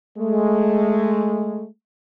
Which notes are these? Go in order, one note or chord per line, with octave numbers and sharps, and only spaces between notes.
G#3 A3